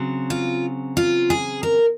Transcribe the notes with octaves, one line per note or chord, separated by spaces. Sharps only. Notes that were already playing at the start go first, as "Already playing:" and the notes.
Already playing: C#3 F#3 C4
F4
F4
G#4
A#4